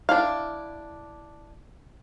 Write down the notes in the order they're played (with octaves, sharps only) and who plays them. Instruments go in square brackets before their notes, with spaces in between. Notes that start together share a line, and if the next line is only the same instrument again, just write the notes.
[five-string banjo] D4 E4 F5